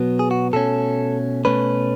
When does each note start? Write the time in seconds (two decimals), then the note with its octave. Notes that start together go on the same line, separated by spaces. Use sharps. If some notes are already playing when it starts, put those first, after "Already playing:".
Already playing: B2 F#3 B3
0.19 G#4
0.31 F#4
0.53 B2 A3 C#4 A4
1.45 B2 A3 C#4 B4